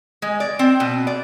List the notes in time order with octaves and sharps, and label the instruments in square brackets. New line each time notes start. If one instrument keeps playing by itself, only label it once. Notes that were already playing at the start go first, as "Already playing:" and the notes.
[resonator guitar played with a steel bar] G#3
D5
C4
B2
D5